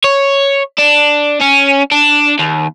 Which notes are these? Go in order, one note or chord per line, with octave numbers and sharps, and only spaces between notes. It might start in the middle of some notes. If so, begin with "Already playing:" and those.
C#5
D4
C#4
D4
D#2